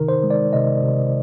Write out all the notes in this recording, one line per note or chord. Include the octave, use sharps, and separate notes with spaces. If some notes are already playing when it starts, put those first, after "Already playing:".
Already playing: C3 D#3 D#4 A#4
C5
G#3
D5
C3 D#5
C3